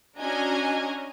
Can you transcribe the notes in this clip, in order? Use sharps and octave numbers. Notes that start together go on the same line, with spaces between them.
C#4 D4 F#4 D#5 G#5 A#5